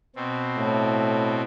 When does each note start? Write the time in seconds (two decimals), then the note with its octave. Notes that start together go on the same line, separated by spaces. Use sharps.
0.16 B2 C4
0.57 A2